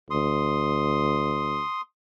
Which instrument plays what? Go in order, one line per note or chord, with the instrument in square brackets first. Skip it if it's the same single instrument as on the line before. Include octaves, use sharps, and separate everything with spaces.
[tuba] D2 [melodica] C6 D#6